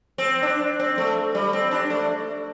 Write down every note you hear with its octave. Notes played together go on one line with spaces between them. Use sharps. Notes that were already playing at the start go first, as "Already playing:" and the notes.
C4
D4
C4
A3
G3
C4
D4
A3